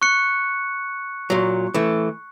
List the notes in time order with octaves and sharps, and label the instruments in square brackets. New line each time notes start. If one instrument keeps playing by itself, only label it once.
[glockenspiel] C#6 F#6 C#7
[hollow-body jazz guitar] A#2 F#3
E3 A3